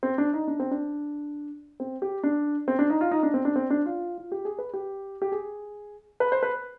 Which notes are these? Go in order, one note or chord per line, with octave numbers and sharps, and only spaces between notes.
C4
D4
D#4
D4
C4
D4
C4
G4
D4
C4
D4
D#4
F4
D#4
D4
C4
D4
C4
D4
F4
F4
G4
G#4
B4
G4
G4
G#4
B4
C5
B4